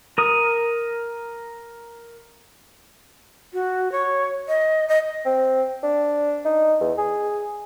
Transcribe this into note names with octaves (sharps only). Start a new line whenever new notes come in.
A#4 D#6
F#4
C#5
D#5
D#5
C4
D4
D#4
E2
G#4